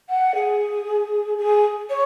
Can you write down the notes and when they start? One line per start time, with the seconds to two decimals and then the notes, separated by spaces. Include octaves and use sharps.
0.09 F#5
0.34 G#4
1.37 G#4
1.89 C#5